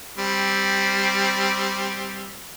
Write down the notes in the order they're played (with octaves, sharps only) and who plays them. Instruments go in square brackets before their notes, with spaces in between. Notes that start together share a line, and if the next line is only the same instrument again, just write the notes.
[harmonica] G3 C4